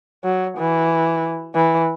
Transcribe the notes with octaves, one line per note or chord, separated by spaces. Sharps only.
F#3
E3
E3